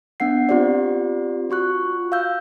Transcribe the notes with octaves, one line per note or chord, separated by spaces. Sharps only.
B3 D4 F#5 C7
C4 F4 G4 C5 D5
F4 F#4 C#6 F#6
F5 E6 G6